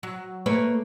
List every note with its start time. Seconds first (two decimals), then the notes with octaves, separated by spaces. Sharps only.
0.03 F#3
0.46 A3 A#3 B4 C#5